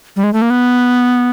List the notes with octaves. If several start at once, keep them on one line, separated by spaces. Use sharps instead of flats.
G3
G#3
A3
A#3
B3